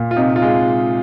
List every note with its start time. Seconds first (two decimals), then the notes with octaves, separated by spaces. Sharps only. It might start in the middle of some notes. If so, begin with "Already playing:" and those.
Already playing: A#2
0.11 F4
0.16 C3 D#4
0.36 F4
0.42 G#3